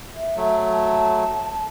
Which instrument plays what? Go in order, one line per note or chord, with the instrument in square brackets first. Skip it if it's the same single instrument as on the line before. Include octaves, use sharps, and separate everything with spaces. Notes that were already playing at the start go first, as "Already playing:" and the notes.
[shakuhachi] E5
[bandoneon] F#3 A3
[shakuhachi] A5